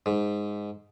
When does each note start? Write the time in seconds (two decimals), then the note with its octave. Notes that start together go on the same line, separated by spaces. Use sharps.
0.06 G#2